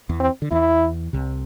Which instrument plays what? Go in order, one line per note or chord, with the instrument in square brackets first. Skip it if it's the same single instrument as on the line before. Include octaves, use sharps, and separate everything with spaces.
[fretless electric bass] E2 E3
[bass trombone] C4
[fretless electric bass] D3
[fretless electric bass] E2 E3 [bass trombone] E4
[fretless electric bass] C2 C3